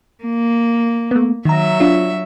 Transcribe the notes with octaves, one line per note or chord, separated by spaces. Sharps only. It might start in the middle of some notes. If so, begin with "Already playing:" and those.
A#3
A3 B3
D#3 F#3 E5 A#5
D4 F4